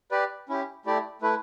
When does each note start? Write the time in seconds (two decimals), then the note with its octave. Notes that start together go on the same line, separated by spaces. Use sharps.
0.11 G4 B4 D5
0.49 C#4 E4 G4
0.85 A3 E4 G4 D5
1.22 A3 E4 B4